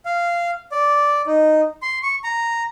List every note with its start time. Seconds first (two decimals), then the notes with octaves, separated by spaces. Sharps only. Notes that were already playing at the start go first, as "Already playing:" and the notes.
0.05 F5
0.72 D5
1.26 D#4
1.82 C6
2.03 C#6
2.24 A#5